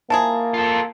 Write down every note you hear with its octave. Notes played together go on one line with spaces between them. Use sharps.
F3 A#3 E4 G#4 A5 A#5
F4 A4